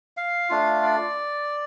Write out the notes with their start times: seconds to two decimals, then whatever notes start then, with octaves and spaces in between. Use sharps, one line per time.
0.17 F5
0.49 A3 D4 F4
0.83 D5